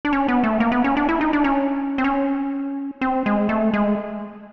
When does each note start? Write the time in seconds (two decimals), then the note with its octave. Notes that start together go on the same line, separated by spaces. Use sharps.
0.05 D4
0.13 C#4
0.28 B3
0.44 A3
0.60 A#3
0.72 B3
0.84 C#4
0.97 D4
1.09 E4
1.21 D#4
1.33 D4
1.44 C#4
1.98 C4
2.04 C#4
3.01 C4
3.26 G#3
3.49 A3
3.74 G#3